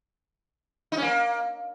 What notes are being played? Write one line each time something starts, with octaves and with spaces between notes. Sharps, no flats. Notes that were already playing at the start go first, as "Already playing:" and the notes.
D#4
C#4
A#3